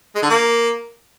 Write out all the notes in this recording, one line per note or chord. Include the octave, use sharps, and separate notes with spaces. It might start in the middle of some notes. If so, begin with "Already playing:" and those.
G#3
D3
A#3